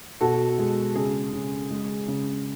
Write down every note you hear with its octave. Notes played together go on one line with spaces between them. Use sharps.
B2 F#4 A4
G#3
C#3 G#4
C#3
G#3
C#3